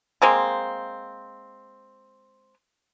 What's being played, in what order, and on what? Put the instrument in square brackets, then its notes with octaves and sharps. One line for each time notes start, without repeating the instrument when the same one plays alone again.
[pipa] G#3 A#3 C4